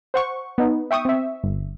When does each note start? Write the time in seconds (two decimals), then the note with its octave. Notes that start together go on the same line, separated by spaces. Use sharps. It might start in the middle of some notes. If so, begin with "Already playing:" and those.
0.14 C5 F#5 C#6
0.58 B3 D#4
0.91 E5 G5 C#6 D#6
1.05 C4 E5
1.44 G1